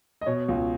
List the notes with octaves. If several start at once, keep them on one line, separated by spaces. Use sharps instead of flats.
D#5
B2 C#5
C#2